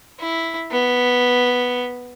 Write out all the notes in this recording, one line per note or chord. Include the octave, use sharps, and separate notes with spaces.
E4
B3